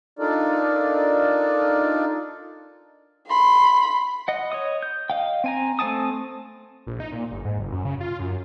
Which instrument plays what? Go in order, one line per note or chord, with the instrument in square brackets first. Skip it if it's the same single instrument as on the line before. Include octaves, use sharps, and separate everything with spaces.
[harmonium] D4 D#4 F4 A4 A#4 D5
[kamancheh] B5 C6
[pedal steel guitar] D#5 F#5
C#5 D#5 D#6
G6
D#5 F5 G5
C4 G#5 A#5
A3 C4 G#5 A5 D#6
[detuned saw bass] A#1
D#4
A#2
G1
G#2
F#1
F#2
C#3
F4
F#2